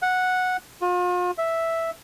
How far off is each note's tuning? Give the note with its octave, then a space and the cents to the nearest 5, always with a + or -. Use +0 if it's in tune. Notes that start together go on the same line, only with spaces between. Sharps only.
F#5 -10
F4 +40
E5 +0